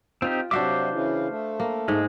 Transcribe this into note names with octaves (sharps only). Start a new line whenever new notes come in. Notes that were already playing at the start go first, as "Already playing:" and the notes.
C4 D#4 F4 G4
C3 F#3 D4 F#4 C5 E5 F5 D6
C#3 E3
A3
A#3
G#2 G#3